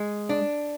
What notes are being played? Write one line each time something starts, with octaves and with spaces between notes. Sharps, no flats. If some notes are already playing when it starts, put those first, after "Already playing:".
Already playing: G#3
D4